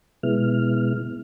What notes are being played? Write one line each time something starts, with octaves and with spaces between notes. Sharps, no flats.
B2 G#3 B3 E4 F6